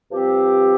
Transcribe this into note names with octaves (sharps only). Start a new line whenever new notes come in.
G2 F3 C4 G4